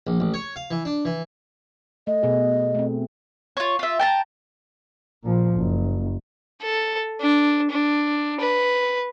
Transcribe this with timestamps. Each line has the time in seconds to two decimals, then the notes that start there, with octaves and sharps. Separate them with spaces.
0.07 A#1
0.20 A1
0.34 C#5
0.56 F5
0.71 E3
0.85 D4
1.05 E3
2.07 A3 D#5
2.23 B2 G#4
2.75 A3 C4
3.57 F4 C#5
3.79 F4 E5
3.99 G5 A5 A#5
5.24 A#2 F3
5.55 F#1
6.62 A4
7.21 D4
7.70 D4
8.40 B4